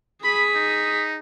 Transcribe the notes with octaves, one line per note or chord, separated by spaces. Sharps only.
G#4 B5 B6
D#4